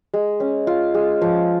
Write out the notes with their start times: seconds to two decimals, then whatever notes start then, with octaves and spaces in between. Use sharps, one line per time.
0.14 G#3
0.40 C#4
0.67 F4
0.94 G#3
1.22 F3